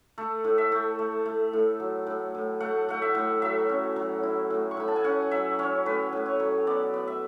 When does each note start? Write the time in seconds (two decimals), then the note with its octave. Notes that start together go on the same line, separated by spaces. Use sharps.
0.18 A3 A4
0.44 A2
0.58 E5
0.72 A3
0.99 A3
1.25 A3
1.53 A2
1.80 F#3
2.07 A2
2.35 A2
2.60 A3 F#5
2.89 A3 F#5
3.02 E5
3.15 A2
3.42 F#3 E5
3.69 C#4
3.96 F#3
4.23 E4
4.50 A2
4.71 C#6
4.77 A2 B5
4.88 A5
4.96 G#5
5.04 C#4 F#5
5.31 F#3 E5
5.59 C#4 C#5
5.86 A2 B4
6.13 A2
6.26 C#5
6.40 F#3
6.67 B3 D5
6.94 B3
7.07 E5